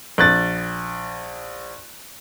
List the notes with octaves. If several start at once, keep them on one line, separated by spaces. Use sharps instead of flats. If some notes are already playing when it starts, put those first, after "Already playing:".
A#1 F#6 A6